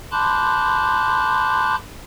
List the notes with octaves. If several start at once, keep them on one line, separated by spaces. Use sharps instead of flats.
A5 B5 C6 D6 F#6 G6